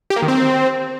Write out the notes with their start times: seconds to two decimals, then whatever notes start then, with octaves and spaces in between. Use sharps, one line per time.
0.10 G4
0.16 A#3
0.22 D#3
0.28 C4